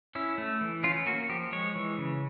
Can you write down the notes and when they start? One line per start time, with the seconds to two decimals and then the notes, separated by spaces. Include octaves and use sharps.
0.15 C#4 E4
0.38 A3
0.61 E3
0.83 C#4 F4
1.06 A#3 F#4
1.29 F3 G4
1.53 G#3 C#5
1.75 E3
1.98 C#3